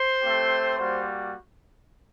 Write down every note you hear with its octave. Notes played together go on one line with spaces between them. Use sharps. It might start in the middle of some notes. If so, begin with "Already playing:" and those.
Already playing: C5 C6
A3 C4 G4
G3 A#3 F#4 C5 C6